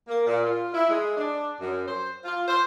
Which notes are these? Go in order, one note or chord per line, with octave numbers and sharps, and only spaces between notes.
A#3
A#2
F4
E4
G#3
D4
F#2
C5
F4
C5